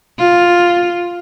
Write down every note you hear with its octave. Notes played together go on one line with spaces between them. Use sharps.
F4